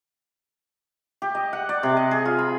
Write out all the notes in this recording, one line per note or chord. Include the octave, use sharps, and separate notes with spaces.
G4
D#5
F#5
D5
C3
D#5
G#4
F4
B5